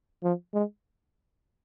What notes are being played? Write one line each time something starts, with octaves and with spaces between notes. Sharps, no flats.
F3
G#3